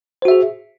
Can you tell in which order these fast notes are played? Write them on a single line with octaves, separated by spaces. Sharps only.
C5 F#4 E5 G#4